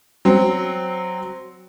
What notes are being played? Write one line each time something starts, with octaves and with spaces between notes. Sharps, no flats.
F#3 C4